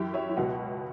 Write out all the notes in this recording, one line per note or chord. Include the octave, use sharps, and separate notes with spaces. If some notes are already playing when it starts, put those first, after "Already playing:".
Already playing: F#2 E3 E4 G4
C#5 E5
E4
C#2 B2 F#4